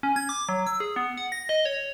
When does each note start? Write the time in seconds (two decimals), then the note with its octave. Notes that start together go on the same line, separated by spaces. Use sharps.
0.03 C#4
0.16 G#6
0.29 D6
0.49 F#3
0.67 E6
0.80 G#4
0.96 B3
1.17 F#5
1.32 A#6
1.49 D#5
1.65 C#5